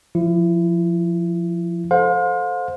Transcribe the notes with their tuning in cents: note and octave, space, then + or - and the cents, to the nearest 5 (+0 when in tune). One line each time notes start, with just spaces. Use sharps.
F3 +0 E4 +30
A4 +0 C5 +0 F5 +40